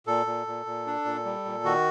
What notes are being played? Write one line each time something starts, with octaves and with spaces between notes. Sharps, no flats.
A#2 A4
A#2
A#2
A#2
D4
A#2
G3
A#2
D#3 F#4